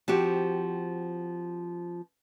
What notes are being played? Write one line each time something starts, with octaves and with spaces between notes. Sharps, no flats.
F3 C4 F#4 G4